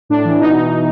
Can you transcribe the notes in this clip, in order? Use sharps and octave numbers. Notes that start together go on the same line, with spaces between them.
A2 D4
E3
B2 D#4